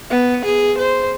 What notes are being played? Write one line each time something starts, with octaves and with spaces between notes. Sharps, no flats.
B3
G#4
C5